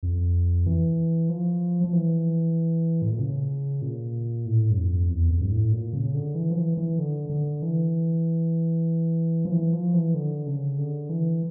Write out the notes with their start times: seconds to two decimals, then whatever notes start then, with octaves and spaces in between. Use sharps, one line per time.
0.03 F2
0.67 E3
1.29 F3
1.84 F3
1.93 E3
3.02 A2
3.11 A#2
3.19 C#3
3.82 A#2
4.46 A2
4.70 G2
4.77 F2
5.09 E2
5.30 F2
5.41 G2
5.51 A2
5.72 A#2
5.93 C#3
6.14 D3
6.35 E3
6.51 F3
6.56 E3
6.77 E3
6.99 D3
7.30 D3
7.62 E3
9.45 F3
9.51 E3
9.73 F3
9.94 E3
10.14 D3
10.46 C#3
10.78 D3
11.09 E3